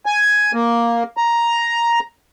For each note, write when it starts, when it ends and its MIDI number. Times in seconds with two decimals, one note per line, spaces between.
0.06 0.52 80
0.53 1.03 58
1.17 1.99 82